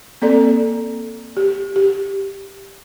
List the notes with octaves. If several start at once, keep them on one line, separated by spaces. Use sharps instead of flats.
A#3 C4 A4 D5
G4
G4